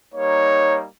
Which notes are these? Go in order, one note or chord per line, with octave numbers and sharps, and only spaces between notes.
G3 A#3 D#4 C#5